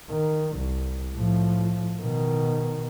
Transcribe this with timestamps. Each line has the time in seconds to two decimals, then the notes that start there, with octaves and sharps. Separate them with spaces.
0.10 D#3
0.57 C2
1.15 A2 F3
2.00 B2 D#3